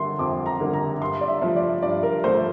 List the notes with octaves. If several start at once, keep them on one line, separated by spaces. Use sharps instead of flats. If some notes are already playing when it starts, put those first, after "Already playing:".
Already playing: D3 G3 A#3 C6
F2 D6
A#5
D3 G3 A#3
A#5
G2 C6
D5
E5
F3 A3
D5
G2 D5
A#4
F3 A3 C5